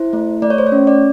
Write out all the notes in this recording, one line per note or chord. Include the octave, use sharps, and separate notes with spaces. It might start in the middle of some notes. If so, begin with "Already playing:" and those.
Already playing: E4 C5
A3
A3 D5
C#5
C5
C#5
C#4
D5